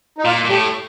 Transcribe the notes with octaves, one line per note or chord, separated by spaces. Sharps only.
D#4
A#2 F4
A#2
A2 G4